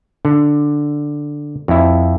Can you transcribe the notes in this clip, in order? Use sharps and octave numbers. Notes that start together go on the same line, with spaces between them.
D3
F2 E4